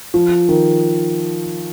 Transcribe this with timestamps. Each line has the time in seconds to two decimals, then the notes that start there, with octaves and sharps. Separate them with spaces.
0.14 F3
0.49 D#3